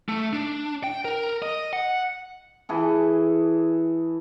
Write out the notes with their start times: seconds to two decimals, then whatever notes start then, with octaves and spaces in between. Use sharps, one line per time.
0.09 A3
0.33 D4
0.84 G5
1.05 A#4
1.42 D#5
1.73 F#5
2.69 E3 G#4 A4